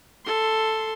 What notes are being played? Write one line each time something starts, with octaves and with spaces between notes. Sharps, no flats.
A4 C6